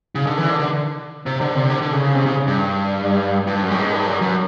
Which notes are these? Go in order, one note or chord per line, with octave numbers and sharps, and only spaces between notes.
C#3
D3
E3
D3
D3
C3
D3
C3
D3
D3
C#3
C3
C#3
G2
G2
F#2
A2
G#2
G2
F#2
F#2